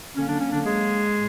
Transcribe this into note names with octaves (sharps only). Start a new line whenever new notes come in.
D3 F#3 A#3 C#4
D3 D4
C#4
D3 D4
G#3 G#4
A2